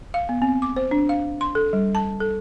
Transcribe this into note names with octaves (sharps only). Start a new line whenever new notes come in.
F5
B3
C4
D6
C5
D4
F5
C6
A4
G3
A5
A4